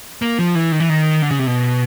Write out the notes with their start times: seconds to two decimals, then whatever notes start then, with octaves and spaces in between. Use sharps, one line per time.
0.22 A#3
0.39 F3
0.55 E3
0.72 D#3
0.80 E3
0.89 D#3
1.22 D3
1.31 C#3
1.39 C3
1.47 B2